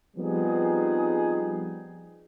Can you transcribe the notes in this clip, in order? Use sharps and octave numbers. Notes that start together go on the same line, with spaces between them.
F3 G3 B3 C4 D#4 G#4